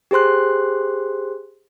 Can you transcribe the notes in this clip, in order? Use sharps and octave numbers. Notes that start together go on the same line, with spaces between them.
G4 G#4 C5 C6 F#6